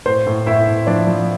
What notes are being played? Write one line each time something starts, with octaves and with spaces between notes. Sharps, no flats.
A2 C5
A2
A2 E4 E5
A2
F3 D4 D5
F3